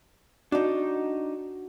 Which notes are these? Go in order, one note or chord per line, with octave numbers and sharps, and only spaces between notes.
D4 D#4 F#4